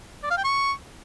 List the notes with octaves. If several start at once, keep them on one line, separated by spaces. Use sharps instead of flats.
D5
F5
G5
C#6